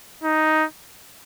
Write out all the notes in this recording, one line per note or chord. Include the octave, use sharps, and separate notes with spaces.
D#4